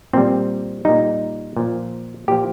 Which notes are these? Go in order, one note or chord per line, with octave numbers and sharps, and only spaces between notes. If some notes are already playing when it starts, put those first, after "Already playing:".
A#2 G3 C4
A#2 G3 D#4
A#2 F3
A#2 F3 G4